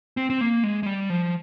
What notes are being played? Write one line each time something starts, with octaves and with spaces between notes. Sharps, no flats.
C4
C4
A#3
G#3
G#3
G3
F3